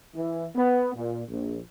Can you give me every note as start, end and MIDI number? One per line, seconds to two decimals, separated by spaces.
0.15 0.45 52
0.55 0.90 59
0.95 1.22 46
1.28 1.59 34